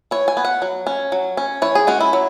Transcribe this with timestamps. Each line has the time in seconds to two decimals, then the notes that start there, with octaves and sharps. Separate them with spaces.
0.11 E3 C#5
0.28 G#5
0.37 B3
0.45 F#5
0.62 F#3
0.87 C#4
1.12 F#3
1.37 C#4
1.62 E3 C#5
1.75 G#4
1.87 G#3 C#4 F#4
2.01 E4
2.13 F#3